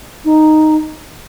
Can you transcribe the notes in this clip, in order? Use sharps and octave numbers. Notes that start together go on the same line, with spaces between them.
D#4